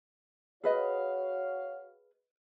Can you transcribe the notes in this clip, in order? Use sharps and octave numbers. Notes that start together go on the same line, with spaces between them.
F#4 G#4 B4 C#5 D#5 F5